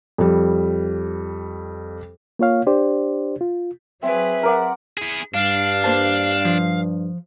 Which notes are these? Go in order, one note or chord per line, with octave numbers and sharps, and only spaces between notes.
F2 G3
A#3 F4 C#5 F5
D4 G4 C5 D5
F4
F#3 C4 G#4 B4 E5
A#4 D5 F#5
E4 G#4
G2 D4 F5
A#3 C5 A5
F3